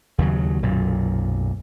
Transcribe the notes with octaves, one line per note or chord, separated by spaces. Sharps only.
D#2 C#3 F#3
B1 F#2 A#2